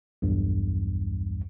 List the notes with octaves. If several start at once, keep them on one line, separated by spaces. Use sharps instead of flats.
B1 E2 G2